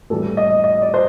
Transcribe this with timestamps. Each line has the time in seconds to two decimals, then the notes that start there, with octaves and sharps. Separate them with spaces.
0.10 A2 E3 G3 A4
0.37 D#5
0.64 D#5
0.82 D5
0.94 C5